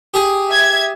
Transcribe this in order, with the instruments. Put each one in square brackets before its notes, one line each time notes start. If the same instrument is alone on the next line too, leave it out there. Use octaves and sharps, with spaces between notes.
[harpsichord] G4 G#4
[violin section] E5 G#6